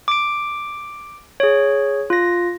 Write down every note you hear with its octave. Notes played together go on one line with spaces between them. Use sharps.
D6 D7
G#4 C#5
F4 A#6